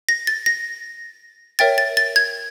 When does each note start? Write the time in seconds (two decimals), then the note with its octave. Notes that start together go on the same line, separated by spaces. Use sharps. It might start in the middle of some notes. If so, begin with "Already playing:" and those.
0.09 A#6
0.27 A6
0.46 A#6
1.59 A#4 C#5 E5 G5 A6
1.78 A6
1.97 A6
2.16 G#6